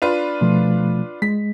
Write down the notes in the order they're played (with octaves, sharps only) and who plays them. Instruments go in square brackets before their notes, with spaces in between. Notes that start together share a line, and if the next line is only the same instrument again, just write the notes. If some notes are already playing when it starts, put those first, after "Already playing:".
[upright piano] D4 F4 B4
[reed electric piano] B2 F3 A3
[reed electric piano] G#3 [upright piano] B6